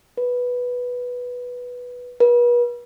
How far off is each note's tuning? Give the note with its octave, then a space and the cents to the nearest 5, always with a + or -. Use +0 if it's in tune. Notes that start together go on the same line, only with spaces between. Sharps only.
B4 -5
B4 -40